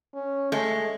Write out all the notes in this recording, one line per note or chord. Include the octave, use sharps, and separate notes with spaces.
C#4
G#3 A3